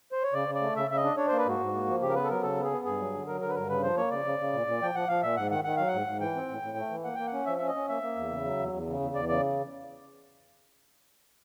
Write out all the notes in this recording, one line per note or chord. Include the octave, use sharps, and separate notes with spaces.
C5
C#5
C#3 D5
C#3
D5
A3
C#3 E5
C#3 E5
D#5
D4
D4 C#5
A#3 C5
B4
G#2 F#4
G#2
A#3
F3
C#3 G4
A#4
B3 B4
A4
F#3 A#4
C#3 A4
B3
G#4
B3
G2 G#4
F#3
D3
F#3 A#4
D3 A#4
B4
G2 A#4
C#3 B4
F3 C5
A#3 C#5
C#3 D5
C#3
C#3
A#2
A#2
F3 G5
F3 F#5
F3 F5
A#2 E5
G#2 F#5
D#3 F#5
D#3 F#5
F#3 F5
F#5
G#2
G#2
E3 G5
C4
A2
A2
A3
E3
A#3 F#5
A#3 G5
F#5
C#4
F3 E5
C#4 E5
D#5
C#4
A#3 E5
A#3
E2
C#3
F#3
E2
E2
C#3
E2
E2 D5
C#3 D5